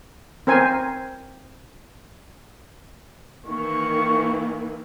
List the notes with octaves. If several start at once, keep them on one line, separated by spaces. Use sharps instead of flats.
C4 A#4 C5 G#5
D#3 E3 A#3 C#6